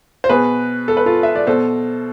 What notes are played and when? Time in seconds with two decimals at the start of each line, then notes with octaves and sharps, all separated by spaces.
0.24 C5
0.29 B2 G#4 B4
0.88 A4
0.97 B4
1.06 F4 A4
1.23 E5
1.35 D5
1.47 B2 A4 C5